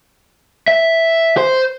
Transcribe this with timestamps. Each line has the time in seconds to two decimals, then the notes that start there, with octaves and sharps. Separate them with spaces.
0.68 E5
1.37 C5